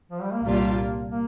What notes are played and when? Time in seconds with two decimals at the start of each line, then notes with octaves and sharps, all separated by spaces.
0.11 F3
0.22 G3
0.32 A#3
0.43 C2 A#2 G3 A#3 D4 F4
1.10 A#3